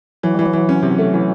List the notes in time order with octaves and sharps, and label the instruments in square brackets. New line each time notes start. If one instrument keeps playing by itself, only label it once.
[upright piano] E3 [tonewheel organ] F#3
[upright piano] E3 [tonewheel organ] G3
[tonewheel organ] F#3
[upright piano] E3
C#4
C3
A3
E3